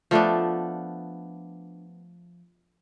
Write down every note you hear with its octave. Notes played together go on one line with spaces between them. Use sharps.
F3 A3 B3 D4